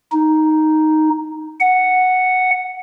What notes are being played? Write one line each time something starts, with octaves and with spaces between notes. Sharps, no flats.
D#4
F#5